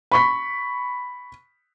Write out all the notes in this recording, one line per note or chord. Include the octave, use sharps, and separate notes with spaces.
B5 C#6 B6